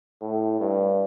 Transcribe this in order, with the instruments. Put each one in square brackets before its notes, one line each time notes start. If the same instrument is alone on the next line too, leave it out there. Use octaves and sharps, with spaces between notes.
[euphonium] A2
G2